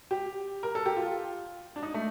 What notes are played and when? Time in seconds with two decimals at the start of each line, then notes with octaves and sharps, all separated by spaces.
0.11 G4
0.63 A#4
0.75 A4
0.86 G4
0.97 F4
1.76 D4
1.83 D#4
1.94 A3